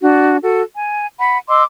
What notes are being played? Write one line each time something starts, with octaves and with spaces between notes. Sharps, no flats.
D4 F#4
F#4 A4
G#5
F#5 B5
D#5 C6 D6 E6